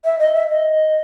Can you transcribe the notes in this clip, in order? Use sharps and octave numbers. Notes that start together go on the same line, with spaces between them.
E5
D#5
E5
D#5